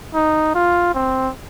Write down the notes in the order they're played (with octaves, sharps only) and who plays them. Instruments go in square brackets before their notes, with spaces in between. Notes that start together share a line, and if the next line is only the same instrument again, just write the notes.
[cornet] D#4
F4
C4